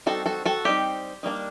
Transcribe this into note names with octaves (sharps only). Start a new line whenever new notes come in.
G3 C4 D#4 F#4 A4
F#4 A4
F#4 A4
G3 C4 D#4 G4
D#3 G3 A#3 D4